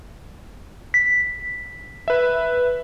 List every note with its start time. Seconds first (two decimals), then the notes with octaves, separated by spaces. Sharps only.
0.94 B6
2.08 B4 E5